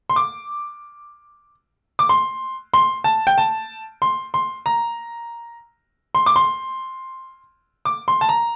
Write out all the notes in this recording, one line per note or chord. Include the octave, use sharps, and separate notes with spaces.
C6
D6
D6
C6
C6
A5
G5
A5
C6
C6
A#5
C6
D6
C6
D6
C6
A5
A#5